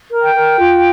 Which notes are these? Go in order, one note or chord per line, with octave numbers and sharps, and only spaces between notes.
A#4
G5
A#4
F4